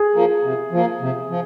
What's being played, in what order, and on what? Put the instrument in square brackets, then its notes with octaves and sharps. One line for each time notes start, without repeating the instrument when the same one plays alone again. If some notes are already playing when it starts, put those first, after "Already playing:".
Already playing: [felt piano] G#4
[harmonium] F3 A#3
C3
F3 A#3
C3
F3